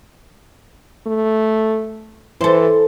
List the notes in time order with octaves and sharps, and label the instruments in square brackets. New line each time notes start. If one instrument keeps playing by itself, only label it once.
[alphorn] A3
[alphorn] E3 [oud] A4 C5